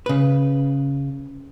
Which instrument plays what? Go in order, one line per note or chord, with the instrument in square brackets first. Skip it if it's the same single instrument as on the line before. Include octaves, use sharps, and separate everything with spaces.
[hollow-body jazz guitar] C#3 B4